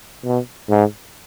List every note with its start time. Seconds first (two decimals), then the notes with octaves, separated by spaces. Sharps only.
0.25 B2
0.70 G#2